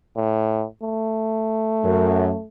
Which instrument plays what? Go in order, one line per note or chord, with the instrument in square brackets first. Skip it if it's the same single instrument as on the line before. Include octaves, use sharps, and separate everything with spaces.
[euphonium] A2
A3
[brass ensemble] F#2